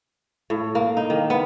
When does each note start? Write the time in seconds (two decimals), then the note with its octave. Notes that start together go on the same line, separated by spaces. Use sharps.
0.50 A2
0.75 A#3
0.97 D#4
1.10 D#3
1.30 B3